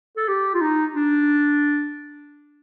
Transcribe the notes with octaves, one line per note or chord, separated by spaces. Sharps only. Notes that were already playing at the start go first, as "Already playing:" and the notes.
A4
G4
F4
D#4
D4